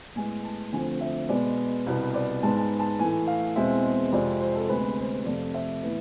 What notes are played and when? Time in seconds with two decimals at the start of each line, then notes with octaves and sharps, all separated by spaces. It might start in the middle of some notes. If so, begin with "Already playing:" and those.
0.16 A2 G#3 B3 G#5
0.44 A5
0.72 D2 D3 F3 A3 C4 G#5
1.01 E5
1.29 B2 G#3 B3 D5
1.86 C2 B2 B3
2.14 D5
2.43 G#2 G#3 B3 A5
2.57 A5
2.80 A5
2.99 A2 E3 A3 G#5
3.27 F5
3.56 E2 B2 G#3 C4 E5
4.12 F2 C3 G#3 C4 D5
4.40 C5
4.55 A4
4.69 D2 C3 G#3 B3 B4
4.98 C5
5.26 F2 C3 F3 A3 C4 D5
5.54 E5
5.83 A2 E3 B3